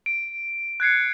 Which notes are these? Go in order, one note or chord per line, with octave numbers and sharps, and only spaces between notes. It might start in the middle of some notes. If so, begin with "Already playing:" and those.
D7
F#6 G#6 C7 C#7